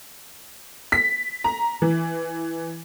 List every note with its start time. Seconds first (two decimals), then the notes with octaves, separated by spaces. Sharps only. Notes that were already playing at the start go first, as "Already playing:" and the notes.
0.92 B6
1.44 A#5
1.82 E3